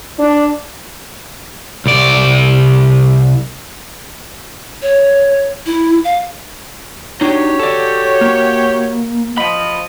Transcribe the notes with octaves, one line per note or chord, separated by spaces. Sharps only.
D4
C2 D5
C#5
E4
F5
D4 D#4 F#4 G4 C#5
A4 D5
A#3
F3 D#5 B5